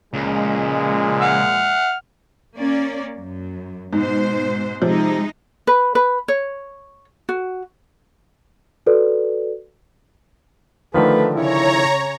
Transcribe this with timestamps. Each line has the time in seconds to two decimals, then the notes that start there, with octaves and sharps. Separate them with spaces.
0.14 C#2 A#2 F3 G#3
1.21 F#5 F6
2.57 A#3 C#4 D5
3.18 F#2
3.93 G#2 B2 C5
4.82 C3 F3 G#3 D#4
5.67 B4
5.95 B4
6.28 C#5
7.29 F#4
8.86 F#4 A4 B4 D5
10.94 D3 D#3 F3 A3 B4
11.36 C#3 E4 C#5 A#5